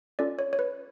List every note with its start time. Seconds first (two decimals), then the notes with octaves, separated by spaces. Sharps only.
0.19 C#4 F4 A4 D5
0.39 C#5
0.53 C#5
0.59 B4